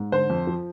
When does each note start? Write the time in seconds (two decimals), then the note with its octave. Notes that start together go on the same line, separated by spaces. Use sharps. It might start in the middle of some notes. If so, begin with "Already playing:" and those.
Already playing: G#2
0.12 D3 C5
0.30 F2
0.47 F3